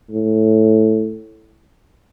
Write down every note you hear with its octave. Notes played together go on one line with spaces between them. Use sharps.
A2